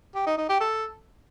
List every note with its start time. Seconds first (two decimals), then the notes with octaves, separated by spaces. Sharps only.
0.15 G4
0.26 D#4
0.37 D#4
0.49 G4
0.60 A4